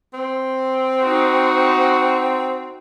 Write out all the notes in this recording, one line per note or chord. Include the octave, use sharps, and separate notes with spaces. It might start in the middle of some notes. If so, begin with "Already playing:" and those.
C4
D#4 F#4